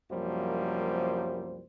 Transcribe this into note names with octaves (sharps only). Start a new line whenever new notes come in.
C2 F#2 F3 G3 A#3 C5